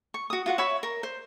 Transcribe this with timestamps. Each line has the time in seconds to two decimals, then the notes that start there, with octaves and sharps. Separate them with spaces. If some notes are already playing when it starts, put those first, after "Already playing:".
0.14 C#6
0.30 F#4 D#6
0.46 F4 F#4 F#5
0.58 C#5 E5 B5 C#6
0.83 A#4
1.03 C5